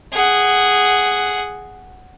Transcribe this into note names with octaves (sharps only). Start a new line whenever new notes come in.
G#4 F#5